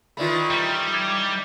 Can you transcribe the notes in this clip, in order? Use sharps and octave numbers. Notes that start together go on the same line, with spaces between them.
D#3 E3 A3 F4 D5 B5
G3
D6 G#6